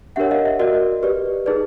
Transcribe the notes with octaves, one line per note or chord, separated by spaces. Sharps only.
D4 G4 A#4 C#5 E5 F#5
D#5 F5
E5
F#4 A#4 D5 D#5
G4 B4 D5
D#4 G#4 B4 D5